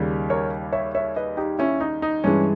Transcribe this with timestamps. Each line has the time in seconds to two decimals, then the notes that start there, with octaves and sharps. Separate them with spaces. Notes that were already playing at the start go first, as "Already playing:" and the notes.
Already playing: D#2 C#3 G3
0.30 A#4 C#5
0.72 C#5 E5
0.95 C#5 E5
1.16 B4 D#5
1.37 D#4 G4
1.59 C#4 E4
1.80 D#4
2.02 D#4
2.24 G2 E3 G#3 C#4